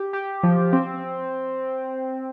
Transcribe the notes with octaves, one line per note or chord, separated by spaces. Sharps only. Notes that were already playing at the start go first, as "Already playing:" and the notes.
Already playing: G4
G4
F3
C4